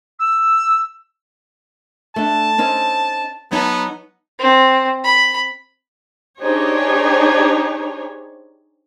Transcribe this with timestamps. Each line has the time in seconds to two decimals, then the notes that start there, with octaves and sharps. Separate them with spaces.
0.19 E6
2.16 A3 D4 A5
2.58 C4 C#4 D#4
3.51 F#3 B3 D#4 A5
4.39 C4
5.04 B5
6.41 D4 D#4 G4 G#4 C5 C#5